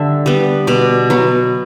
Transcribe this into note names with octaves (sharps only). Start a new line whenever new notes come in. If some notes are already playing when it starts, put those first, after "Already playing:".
Already playing: D3 G3 E5
G3 B3
B2 D5
F#3 B3